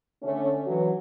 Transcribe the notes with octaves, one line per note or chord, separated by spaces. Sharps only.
D3 A3 C#4
E3 F#3